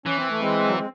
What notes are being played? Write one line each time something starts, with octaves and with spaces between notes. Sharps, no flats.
E3 C#4
C4
A3
G#3 C4
F#3
G#3